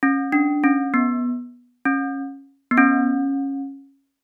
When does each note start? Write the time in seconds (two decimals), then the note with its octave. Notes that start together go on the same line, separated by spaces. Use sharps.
0.03 C#4
0.32 D4
0.64 C#4
0.94 B3
1.85 C#4
2.71 B3
2.77 C#4